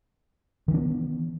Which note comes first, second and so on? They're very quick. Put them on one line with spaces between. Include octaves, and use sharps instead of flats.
D#3 E3 D4 B3